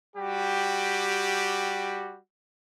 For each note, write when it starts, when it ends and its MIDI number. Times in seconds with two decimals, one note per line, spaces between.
0.17 2.17 55
0.17 2.17 66
0.17 2.17 67